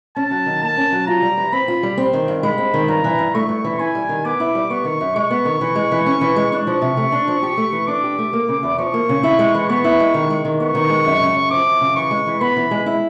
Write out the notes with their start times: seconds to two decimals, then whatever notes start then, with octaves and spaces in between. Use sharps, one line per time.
0.16 C#4 A5
0.31 F#3
0.46 D#3
0.62 A#3 A5
0.77 C#4
0.92 F#3
1.07 F4 A#5
1.22 G3
1.37 E3
1.52 C4 B5
1.68 F4
1.83 G3
1.97 C4
2.13 D#3
2.28 G2
2.43 G#3 B5
2.58 C4
2.74 D#3
2.88 G2 A#5
3.04 E3
3.19 G2
3.34 A3 C#6
3.49 G2
3.64 E3
3.79 E4 G#5
3.95 G3
4.09 D#3
4.25 B3 D6
4.40 E4
4.55 G3
4.70 B3 C#6
4.85 D#3
5.01 F#2
5.16 G#3 C#6
5.30 B3
5.45 D#3
5.61 E3
5.75 G#3
5.92 E3
6.06 C#4
6.21 E3
6.36 G#3
6.51 D4 C#6
6.67 F3
6.82 C3
6.97 A3
7.12 D4
7.28 F3
7.43 G4
7.57 A3
7.72 E3
7.87 D4 D6
8.04 G4
8.18 A3
8.33 A#3
8.49 C#3
8.63 E2
8.78 F3 C#6
8.94 A#3
9.09 C#3
9.23 E4
9.39 G#3
9.54 E3
9.69 B3 C#6
9.84 E4
10.00 G#3
10.14 D#3
10.30 G#3
10.45 D#3
10.60 B3 C#6
10.75 D#3
10.90 G#3
11.05 F#2
11.21 C#3
11.35 F#2
11.51 F3 D6
11.66 F#2
11.81 C#3
11.96 E3 C#6
12.11 G#3
12.26 E3
12.41 B3 B5
12.56 E3
12.71 G#3
12.86 E4